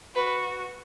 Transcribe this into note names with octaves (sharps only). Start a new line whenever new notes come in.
F#4 B4